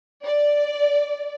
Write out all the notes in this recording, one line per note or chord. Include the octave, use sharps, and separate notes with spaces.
D5